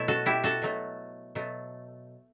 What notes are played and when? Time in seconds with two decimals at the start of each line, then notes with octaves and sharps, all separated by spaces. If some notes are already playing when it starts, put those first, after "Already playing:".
Already playing: B2 F#3 A3 E4
0.08 F#4 A4
0.26 E4 G4
0.44 F#4 A4
0.62 B2 F#3 A3
1.35 B2 F#3 A3